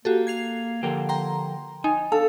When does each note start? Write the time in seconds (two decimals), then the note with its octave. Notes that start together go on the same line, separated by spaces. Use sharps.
0.05 A#3 F#4 G4 A4
0.27 G#6 C7 F7
0.83 D3 F3 A#3 G4
1.09 G5 A#5 C6
1.84 D#4 G#5
2.12 D4 A4 F5